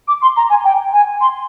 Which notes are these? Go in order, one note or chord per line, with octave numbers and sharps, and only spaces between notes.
D6
C6
A#5
G#5
G5
G#5
C6